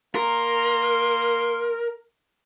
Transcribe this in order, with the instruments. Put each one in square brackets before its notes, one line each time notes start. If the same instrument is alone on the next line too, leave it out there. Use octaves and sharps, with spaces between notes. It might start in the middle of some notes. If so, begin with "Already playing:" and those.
[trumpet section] A#3 C6 [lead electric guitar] A#4